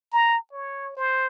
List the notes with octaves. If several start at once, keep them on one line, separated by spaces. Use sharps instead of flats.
A#5
C#5
C5